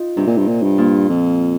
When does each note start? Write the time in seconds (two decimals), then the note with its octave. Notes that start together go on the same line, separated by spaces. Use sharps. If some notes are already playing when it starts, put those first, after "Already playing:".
Already playing: D#4 F4
0.17 G2 C3
0.27 A#2
0.38 G2
0.48 A#2
0.63 G2
0.78 A#2
1.09 F2